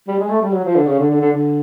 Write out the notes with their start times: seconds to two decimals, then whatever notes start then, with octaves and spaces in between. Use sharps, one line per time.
0.08 G3
0.20 G#3
0.30 A3
0.42 G3
0.53 F#3
0.65 F3
0.76 D3
0.87 C#3
0.99 D3
1.10 D3
1.21 D3
1.32 D3